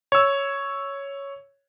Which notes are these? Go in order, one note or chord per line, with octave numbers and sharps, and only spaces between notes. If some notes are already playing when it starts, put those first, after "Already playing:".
C#5 E6